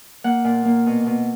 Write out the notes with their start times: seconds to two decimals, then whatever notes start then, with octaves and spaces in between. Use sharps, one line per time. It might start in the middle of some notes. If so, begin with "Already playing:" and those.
0.24 A#3 F#5
0.44 A#2
0.65 A#3
0.86 B2
1.06 B2